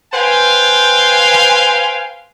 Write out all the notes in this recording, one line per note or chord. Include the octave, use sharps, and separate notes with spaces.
B4 C5 F5 G5 G#5